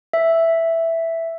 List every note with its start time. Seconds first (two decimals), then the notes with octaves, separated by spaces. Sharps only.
0.13 E5